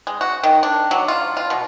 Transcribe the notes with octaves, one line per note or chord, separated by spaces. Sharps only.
G#3
F#4
D#3
D4
F#3
F4
F4
B2